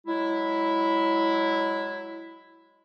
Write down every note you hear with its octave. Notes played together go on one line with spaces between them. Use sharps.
F#3 G#3 E4